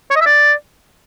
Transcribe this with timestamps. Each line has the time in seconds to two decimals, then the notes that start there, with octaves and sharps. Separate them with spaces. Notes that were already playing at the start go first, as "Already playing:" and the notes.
0.10 C#5
0.16 D#5
0.21 E5
0.26 D5